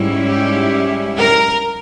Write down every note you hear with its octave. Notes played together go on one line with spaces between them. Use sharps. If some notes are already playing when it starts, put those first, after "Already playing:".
Already playing: G#2 G3 C#4 E4
G4
A#4